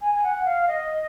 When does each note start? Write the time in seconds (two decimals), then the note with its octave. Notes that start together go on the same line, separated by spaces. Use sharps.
0.01 G#5
0.15 G#5
0.23 F#5
0.45 F5
0.67 D#5